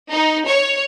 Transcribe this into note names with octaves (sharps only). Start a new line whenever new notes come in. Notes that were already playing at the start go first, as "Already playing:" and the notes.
D#4
C#5